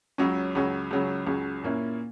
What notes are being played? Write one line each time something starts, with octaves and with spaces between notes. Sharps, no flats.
C#2 C#3 F#3 C#4
C#2 C#3 F#3 C#4
C#2 C#3 F#3 C#4
C#2 C#3 F#3 C#4
A#2 A#3 C#4 E4